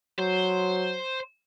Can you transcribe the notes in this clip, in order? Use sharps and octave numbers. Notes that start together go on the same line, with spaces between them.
F#3 C5